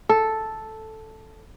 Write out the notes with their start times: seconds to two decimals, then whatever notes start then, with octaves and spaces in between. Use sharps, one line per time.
0.09 A4